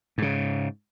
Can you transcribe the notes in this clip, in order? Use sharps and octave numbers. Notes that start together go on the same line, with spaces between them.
G#2 C#3